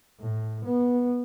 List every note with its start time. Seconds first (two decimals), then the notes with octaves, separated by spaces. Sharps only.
0.20 A2
0.64 B3